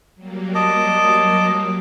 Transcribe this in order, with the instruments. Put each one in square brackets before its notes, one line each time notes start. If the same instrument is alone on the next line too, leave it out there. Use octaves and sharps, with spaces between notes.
[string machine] F#3 G3 A#3
[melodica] D#5 A5 D6